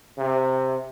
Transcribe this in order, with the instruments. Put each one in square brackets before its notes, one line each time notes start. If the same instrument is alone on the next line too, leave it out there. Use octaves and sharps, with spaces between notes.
[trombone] C3